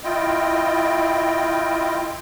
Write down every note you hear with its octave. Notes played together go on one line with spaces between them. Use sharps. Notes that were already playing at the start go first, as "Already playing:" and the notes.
E4 F4 D#5 G5